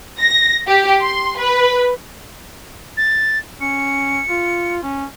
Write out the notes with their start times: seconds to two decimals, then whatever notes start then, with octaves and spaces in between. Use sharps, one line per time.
0.19 A#6
0.68 G4
1.01 C6
1.38 B4
2.97 A6
3.61 C#4 C#7
4.29 F4
4.83 C#4